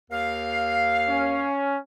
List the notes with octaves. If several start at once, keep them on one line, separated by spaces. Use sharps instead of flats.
D#2 A#4 F5
C#4